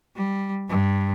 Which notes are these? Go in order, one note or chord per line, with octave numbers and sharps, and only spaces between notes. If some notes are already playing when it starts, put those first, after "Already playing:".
G3
G2